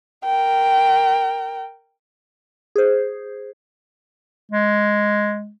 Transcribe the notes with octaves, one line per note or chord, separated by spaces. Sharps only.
A#4 G5
G#4 C5
G#3